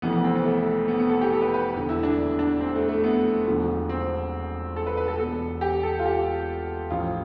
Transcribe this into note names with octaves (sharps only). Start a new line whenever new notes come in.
F1 F2 E3 A3 B3
B3
C4
B3
A3
B3
B3
A4
G4
A4
B4
B4
E1 E2 D3 A3
E4
D4
D4
C4
A3
A3
B3
E1 E2 D3 F3
C4
A4
B4
B4
A4
E1 E2 B2 A4
G4
A4
F4
G4
A1 A2 F3 F4